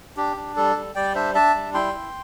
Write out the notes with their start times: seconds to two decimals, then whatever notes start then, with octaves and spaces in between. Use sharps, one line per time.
0.17 D4 G4
0.36 D4
0.56 G3 A4
0.76 G3
0.95 G3 D5 G5
1.15 D4 C5 E5
1.35 D4 E5 A5
1.54 G3
1.74 E4 G5 C6
1.93 E4